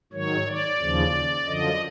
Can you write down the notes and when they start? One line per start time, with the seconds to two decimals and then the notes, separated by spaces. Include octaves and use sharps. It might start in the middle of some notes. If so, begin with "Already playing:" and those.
0.13 G#2 D#3 F#3 C#5
0.47 D5
0.80 D#2 C#3 F3
1.46 F#2 D3 F3 D#5